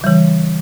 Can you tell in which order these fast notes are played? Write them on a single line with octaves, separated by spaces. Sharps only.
C#3 G3 E3